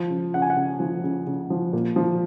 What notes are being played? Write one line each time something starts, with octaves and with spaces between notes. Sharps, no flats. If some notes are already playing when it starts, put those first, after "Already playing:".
Already playing: F3
C#3
C#3 F#5
G#5
F#5
C#3
F3
C#3
C#3
F3
A#2
F3